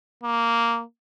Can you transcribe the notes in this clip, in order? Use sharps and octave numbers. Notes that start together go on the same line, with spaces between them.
A#3